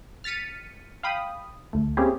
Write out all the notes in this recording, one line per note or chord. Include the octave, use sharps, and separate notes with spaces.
F6 A6 B6 C#7 D#7
F5 G5 B5 D#6
D2 A3
A#3 C4 C#4 E4 G4 G#4